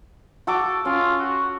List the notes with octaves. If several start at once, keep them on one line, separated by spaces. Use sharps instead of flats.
F#4 A4 D6
C#4 F4
F#4